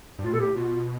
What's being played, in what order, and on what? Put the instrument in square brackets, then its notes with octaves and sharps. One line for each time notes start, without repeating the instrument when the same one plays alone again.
[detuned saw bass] G2
[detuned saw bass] A2 [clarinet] F4
[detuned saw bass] B2 [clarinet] A4
[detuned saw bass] A2 [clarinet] G4
[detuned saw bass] B2 [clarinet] F4